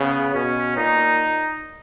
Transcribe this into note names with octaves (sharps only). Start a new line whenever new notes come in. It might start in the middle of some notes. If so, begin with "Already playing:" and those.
Already playing: C#3 B3
B2 C#4
A#2 D#4